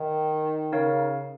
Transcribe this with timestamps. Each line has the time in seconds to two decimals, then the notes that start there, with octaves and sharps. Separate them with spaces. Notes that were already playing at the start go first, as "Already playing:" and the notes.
Already playing: D#3
0.72 C#3 D#4 A#4 C#5 F5